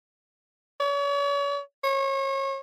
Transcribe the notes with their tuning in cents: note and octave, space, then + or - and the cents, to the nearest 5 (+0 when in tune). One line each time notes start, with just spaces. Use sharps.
C#5 +40
C#5 -30